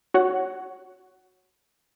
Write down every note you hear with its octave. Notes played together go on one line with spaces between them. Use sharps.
F#4 C#5 F#5